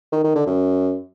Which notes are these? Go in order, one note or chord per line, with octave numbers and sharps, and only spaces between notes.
D#3
D#3
D3
F#2